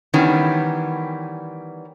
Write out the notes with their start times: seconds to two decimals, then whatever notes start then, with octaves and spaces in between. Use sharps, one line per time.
0.14 D#3 E3 G3 B3 C#4